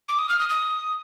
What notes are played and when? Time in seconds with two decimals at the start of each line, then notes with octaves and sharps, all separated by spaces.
0.09 D6
0.19 D#6
0.29 F6
0.39 D#6
0.49 D#6